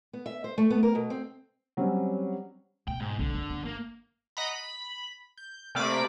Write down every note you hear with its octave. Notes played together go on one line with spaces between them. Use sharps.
B3
E5
C5
A3
B3
A#4
B2
C4
F#3 G3 C4 C#4
B2 G5
G#2
B1 D3
F#2
G1
A#3
D#5 F#5 A#5 B5
B5
G6
C3 A3 A#3 D5 B5 D6